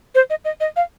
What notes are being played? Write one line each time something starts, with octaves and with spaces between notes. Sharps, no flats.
C5
D#5
D#5
D#5
F5